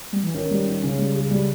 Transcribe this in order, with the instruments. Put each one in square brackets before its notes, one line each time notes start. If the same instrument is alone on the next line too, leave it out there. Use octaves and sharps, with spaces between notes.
[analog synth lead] G3
E3
[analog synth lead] D#3 [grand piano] C#4
[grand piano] G3
C#4
[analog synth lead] C#3 [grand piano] C#4
[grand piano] G3
G#4
G3